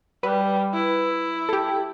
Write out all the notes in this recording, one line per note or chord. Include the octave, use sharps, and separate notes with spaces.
G3 B4
E4
G4 A4